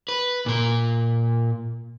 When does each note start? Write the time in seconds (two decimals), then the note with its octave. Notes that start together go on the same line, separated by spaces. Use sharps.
0.08 B4
0.46 A#2 A#4